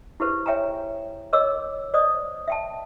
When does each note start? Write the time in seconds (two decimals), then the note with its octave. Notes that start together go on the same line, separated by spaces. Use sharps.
0.20 E4 G4 G#4 B4 C5
0.46 C#5 E5 G5 G#5 A#5
1.33 A#4 C#5 D#5 D6 E6
1.94 C5 D5 D#5 D#6
2.48 E5 G5 A5